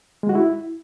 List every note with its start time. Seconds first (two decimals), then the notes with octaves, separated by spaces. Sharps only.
0.23 G#3
0.29 F#4
0.35 E4